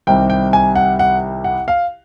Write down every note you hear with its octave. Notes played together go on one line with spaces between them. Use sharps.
C2 C3 D#3 G3 C4 G5
G5
G#5
F#5
F#5
F#5
F5